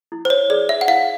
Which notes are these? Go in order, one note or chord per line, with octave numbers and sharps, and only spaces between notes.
E4
C5
C#5
G#4 B4 D5
E5
F#5
E4 F5